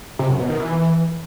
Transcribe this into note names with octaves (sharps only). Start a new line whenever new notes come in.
C3
F#2
B2
D#3
E3